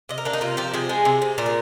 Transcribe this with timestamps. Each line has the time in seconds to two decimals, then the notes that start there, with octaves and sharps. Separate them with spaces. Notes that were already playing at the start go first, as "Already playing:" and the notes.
0.09 C3 D#5
0.18 A#4
0.25 A#3 D4
0.33 D#4
0.41 C3 F4
0.57 F3 G4
0.74 C3 G#4
0.89 G#3
1.05 C3
1.22 C3
1.38 A#2 A#4
1.46 G#4